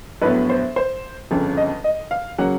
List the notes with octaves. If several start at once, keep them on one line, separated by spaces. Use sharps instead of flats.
A#1 A2 F#3 B3 B4
C5
C5
G1 F2 C#3
D#5
D#5
F5
C#3 F#3 A#3 F#5